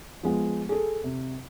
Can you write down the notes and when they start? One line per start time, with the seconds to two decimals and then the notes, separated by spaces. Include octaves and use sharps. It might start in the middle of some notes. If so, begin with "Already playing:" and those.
0.23 F3 G#3 B3
0.69 G#4 A4
1.04 C3